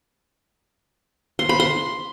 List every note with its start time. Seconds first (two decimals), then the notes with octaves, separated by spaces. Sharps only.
1.39 C6
1.49 B5
1.60 C6